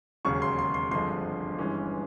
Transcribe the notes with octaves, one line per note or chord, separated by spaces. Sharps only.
E1 D#2 C#3 F#3 C#6
C6
C6
C6
G#1 G2 D3 F3 G#3 C6
G1 G2 E3 G#3 C#4